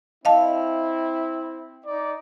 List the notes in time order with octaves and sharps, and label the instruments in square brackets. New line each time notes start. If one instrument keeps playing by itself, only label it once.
[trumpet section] C4 E4 [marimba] D#5 F5 A5
[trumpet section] D#4 D5